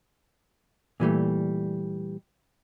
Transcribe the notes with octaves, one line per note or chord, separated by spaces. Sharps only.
A#2 E3 G3 A3